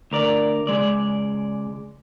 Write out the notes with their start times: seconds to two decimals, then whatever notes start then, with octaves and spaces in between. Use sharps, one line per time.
0.11 D2 A#4 D5
0.67 C#2 C3 G#3 D5